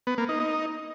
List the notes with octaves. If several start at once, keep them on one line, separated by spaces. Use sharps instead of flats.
B3
A#3
D#4
D#4